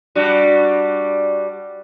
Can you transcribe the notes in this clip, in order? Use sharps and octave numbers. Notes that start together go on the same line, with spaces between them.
G3 D4 F#4